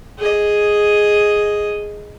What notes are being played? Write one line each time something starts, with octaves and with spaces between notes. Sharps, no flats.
G#4 D#5